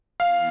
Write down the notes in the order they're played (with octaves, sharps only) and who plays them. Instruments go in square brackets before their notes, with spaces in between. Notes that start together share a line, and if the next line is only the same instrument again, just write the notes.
[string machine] E3 B3 [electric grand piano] F5